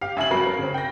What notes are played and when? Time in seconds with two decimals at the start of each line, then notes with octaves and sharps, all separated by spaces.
0.01 G4 F5
0.17 A1 E5 G#5 F#7
0.30 G#1 F#3 A#4 B5 C7
0.46 A#4
0.58 C#3 C4
0.74 G5 A#6